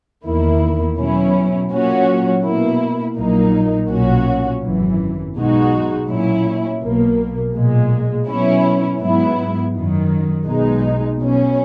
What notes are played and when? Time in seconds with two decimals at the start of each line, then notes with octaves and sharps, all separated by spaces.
0.25 E2 D#3 A#3 E4
0.97 B2 F#3 C#4 E4
1.70 A#2 F#3 C#4 F#4
2.44 B2 A#3 E4
3.16 A#1 A#2 F#3 A#3 D#4
3.89 B1 A#2 F#3 C#4 F#4
4.62 G#1 F#2 E3
5.35 B1 B2 G#3 D#4 F#4
6.08 A#2 F#3 C#4 E4
6.82 B1 B2 A#3
7.54 B1 A#2 G#3
8.27 B2 F#3 C#4 E4
9.00 G#2 F#3 B3 E4
9.73 F#2 D#3 F#3
10.46 B1 B2 G#3 D#4
11.20 B2 F#3 C#4